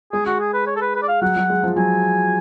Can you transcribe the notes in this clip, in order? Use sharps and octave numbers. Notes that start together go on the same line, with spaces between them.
G#3 G#4
F#4
G#4
B4
C#5
A4
B4
B4
D5
F5
F#3 F#5
F#3
G#3
F3
F#3 G#5